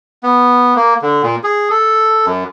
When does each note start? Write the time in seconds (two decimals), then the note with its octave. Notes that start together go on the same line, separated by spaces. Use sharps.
0.23 B3
0.76 A#3
1.02 D3
1.23 A#2
1.44 G#4
1.70 A4
2.26 F#2